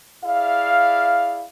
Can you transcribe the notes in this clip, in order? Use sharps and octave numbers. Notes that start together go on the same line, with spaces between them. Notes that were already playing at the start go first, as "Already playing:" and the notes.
E4 G#4 D5 E5 F5